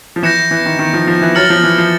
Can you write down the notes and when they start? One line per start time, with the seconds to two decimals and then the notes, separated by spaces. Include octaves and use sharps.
0.16 F3
0.23 E3 G6 A#6 C#7 E7
0.51 E3
0.66 D#3
0.79 D#3
0.93 F3
1.07 F3
1.22 E3
1.35 F#3 F6 A6 C#7 F#7
1.50 F3
1.63 E3
1.78 F3